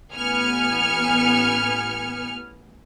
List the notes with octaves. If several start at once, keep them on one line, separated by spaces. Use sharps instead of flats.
A1 B3 G#5 F6 C#7